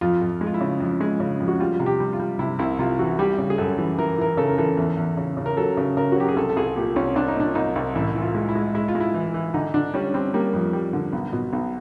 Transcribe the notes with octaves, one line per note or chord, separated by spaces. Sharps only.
F2 F4
F2
G#3
F4
E4
C#3
F2
G#3
C#3
F2
F#4
G3 F4
C3
G4
G3
F4
G3
C3 E4
C2 E4
C3 F4
E3 F#4
G3 G4
C#3
G#4
F#2 A4
E3
E3 A#4
E3 A#4
C#3 A4
A#4
E3 A4
E2
E2
C#3
C#3
A#4
F#3 A4
C#3
C#3 A#4
F#4
F#3 G4
G#4
C2 A4
A4
C2 G#4
A#2 G4
C2 C#4
C2 D4
D#4
A#2 D4
C2 D#4
C2
A1 E4
E3
F4
G#3
E4
G#3
G#3 E4
F4
G#3
E4
E3
E3
D3 D#4
D3 D4
G3 C#4
G3 C4
G3 A#3
F2
G3
D3
B1
B2
B1